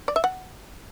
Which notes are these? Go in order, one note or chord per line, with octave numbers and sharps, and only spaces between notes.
D5
E5
F#5